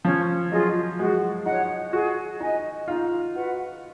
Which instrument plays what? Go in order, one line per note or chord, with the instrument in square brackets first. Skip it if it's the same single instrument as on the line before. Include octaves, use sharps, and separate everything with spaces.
[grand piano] F3 [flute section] C#4
[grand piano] F#3 [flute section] F4 G#4 D#5
[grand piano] G#3 [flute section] F#4
[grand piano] D#4 [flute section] C#5 F#5
[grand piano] F#4 [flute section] G#4
[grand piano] D#4 [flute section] D#5 G#5
[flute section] D#4 [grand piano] F4
[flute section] F#4 B4 F#5